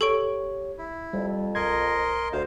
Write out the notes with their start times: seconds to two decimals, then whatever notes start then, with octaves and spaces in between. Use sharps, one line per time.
0.01 G4 A4 C#5 C#6 D7
0.79 E4
1.13 F2 G3
1.55 B1 A#4 D#5 C6 G#6
2.33 D2 C5 F5